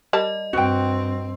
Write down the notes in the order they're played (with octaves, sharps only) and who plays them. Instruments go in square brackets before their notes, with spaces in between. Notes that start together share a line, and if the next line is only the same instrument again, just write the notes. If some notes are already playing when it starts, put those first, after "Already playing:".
[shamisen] G3 A#4 A5 [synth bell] D#5
[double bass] G2 C4 [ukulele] F#4 G5